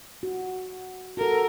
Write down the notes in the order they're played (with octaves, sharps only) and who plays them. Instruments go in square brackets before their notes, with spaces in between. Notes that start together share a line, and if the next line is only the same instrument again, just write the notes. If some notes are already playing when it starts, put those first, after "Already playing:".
[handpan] F#4
[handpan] F#4 A4 [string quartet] A#4